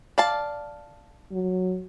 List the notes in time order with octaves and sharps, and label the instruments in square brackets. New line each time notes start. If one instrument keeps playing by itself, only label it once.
[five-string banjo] D5 F5 A5
[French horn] F#3